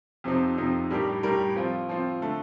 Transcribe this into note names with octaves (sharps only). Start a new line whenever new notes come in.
F2 C3 F3 C4 D#4
F2 C3 F3 C4 D#4
A2 G3 D4 G4 A#4
A2 G3 D4 G4 A#4
F3 C4 F4
F3 C4 F4
D3 A3